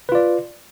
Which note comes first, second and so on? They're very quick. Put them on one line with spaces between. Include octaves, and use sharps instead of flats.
B4 F4 D5